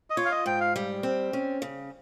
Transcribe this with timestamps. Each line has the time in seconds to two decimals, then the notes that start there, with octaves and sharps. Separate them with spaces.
0.10 D#5
0.17 F4 C#5
0.25 F5
0.32 D#5
0.46 G#2 G5
0.60 F5
0.76 G3
1.03 C4
1.33 C#4
1.62 C#3